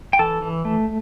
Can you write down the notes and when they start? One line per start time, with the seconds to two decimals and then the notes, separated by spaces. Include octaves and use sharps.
0.13 G5
0.19 E3 A4 A5
0.42 E3
0.65 A3